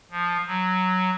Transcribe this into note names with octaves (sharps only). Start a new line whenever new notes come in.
F3
F#3